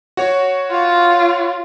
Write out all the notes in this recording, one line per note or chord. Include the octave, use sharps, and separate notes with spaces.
F#4 C#5
F4